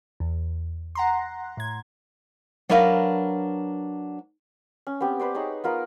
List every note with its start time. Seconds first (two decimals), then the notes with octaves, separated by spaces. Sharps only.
0.20 E2
0.95 F#5 A#5 C6
1.57 A2 G#6
2.69 F#3 D4 A#4 B4 E5 F5
4.87 C#4
5.01 B3 C4 G4
5.20 B4 C5 D5
5.34 D#4 G#4 C#5 F#5
5.64 B3 F4 A#4 B5